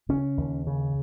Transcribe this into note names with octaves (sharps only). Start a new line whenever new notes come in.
C#3 C#4
D#2
C#3